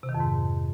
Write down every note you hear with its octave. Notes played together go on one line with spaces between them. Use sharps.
C3
D#3
F2
G#2